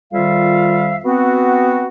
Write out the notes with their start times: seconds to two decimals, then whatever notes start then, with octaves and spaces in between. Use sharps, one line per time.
0.13 F2 D#3 G3 F4 E5 F5
1.05 B3 C4 F#4